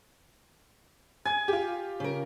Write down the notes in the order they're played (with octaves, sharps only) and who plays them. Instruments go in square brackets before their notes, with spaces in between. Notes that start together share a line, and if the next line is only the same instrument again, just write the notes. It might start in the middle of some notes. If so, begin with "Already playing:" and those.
[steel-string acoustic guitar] G#5 [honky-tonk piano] G#6
[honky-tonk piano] F4 G4
[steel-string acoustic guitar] C#3 A#4